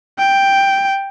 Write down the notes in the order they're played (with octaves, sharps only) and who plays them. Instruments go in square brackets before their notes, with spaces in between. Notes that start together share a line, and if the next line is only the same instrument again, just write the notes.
[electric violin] G5